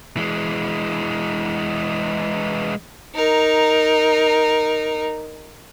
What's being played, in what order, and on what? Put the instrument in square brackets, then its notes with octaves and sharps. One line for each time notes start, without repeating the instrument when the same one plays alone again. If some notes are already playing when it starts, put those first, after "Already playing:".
[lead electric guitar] E3 G#3
[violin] D#4 A#4